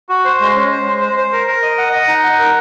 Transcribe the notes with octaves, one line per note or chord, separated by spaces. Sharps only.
F#4
C5
G#3
C#4
C5
G#3
C5
C5
A#4
A#4
D#5
F#5
D#5
D#4
F#5
A#4